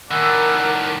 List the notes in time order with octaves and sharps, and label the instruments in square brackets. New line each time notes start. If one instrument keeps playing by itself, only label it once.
[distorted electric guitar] A2 D#3 [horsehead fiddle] A#4 D5 [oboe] F#5 [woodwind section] G#5 B5 E6